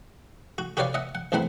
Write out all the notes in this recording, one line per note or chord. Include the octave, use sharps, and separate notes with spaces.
F#4
F#4 G4 B4 C#5 D5 F5
D#5 E5 F#5
F#5
A1 E2 E3 C4 F#5 B5